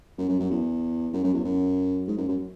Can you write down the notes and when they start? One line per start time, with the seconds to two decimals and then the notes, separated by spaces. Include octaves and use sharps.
0.18 F#2
0.29 F#2
0.39 F#2
0.50 E2
1.13 F#2
1.24 F#2
1.34 E2
1.44 F#2
2.07 G#2
2.18 F#2
2.28 F#2